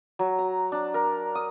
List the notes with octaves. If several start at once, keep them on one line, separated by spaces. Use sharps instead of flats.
F#3
A#5
D4
A#4
D#6